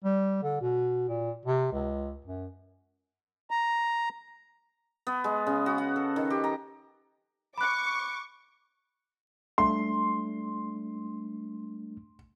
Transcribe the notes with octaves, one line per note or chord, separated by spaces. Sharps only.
G3
D3
B2
A#2
C3
C#2
F#2
A#5
B3
G#3
C#3
F#4
F#5
A4
D#3
G4
A#5
B5 C#6 D6 F#6
G3 A3 D4 C6